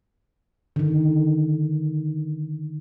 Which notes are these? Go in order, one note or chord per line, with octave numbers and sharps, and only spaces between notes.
D3 D#3